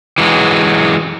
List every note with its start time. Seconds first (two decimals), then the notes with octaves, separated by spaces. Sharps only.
0.18 E3 F#3 G#3